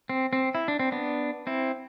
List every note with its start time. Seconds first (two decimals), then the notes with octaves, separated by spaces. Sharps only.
0.09 C4
0.33 C4
0.55 E4
0.68 D4
0.79 C4
0.92 B3 D4
1.47 C4 E4